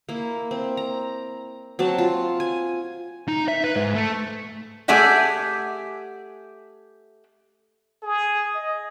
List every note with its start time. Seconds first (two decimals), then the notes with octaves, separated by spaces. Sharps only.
0.09 A#3 E4
0.51 C4
0.77 A#5
1.79 F#3 C4 F#4 A5
1.98 F4
2.40 G#5
3.28 D#4
3.48 E5
3.64 B4
3.76 G#2
3.95 A3
4.88 A3 G4 G#4 D5 E5 F#5
8.03 G#4
8.55 D#5